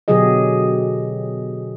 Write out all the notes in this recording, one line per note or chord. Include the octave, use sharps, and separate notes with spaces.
B2 D3 F#3 G4 G#4 D#5